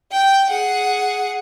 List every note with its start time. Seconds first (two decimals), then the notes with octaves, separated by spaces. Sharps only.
0.12 G5
0.50 G#4 F#5